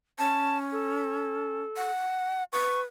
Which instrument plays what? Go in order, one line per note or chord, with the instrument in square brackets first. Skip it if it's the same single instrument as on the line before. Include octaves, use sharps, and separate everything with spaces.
[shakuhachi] C#4 [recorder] A5
[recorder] A4
[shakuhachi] F#5
[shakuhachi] B4 [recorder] C#6